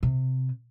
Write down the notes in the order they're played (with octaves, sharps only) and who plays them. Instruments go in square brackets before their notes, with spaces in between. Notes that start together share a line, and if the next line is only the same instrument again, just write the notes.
[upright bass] C3